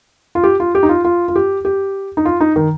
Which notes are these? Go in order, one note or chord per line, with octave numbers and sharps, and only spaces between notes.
F4
G4
F4
G4
D#4
F4
F4
F4
G4
G4
D#4
F4
D#4
D#3